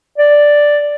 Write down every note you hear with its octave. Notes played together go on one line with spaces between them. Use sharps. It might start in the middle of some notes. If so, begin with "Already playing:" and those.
D5